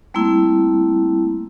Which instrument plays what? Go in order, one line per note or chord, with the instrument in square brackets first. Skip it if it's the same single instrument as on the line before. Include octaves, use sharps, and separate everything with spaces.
[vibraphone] G3 A3 A#3 C4 E4